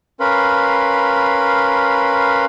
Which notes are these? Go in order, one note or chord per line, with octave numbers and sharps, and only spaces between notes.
C#4 A#4 B4 F5 B5 C6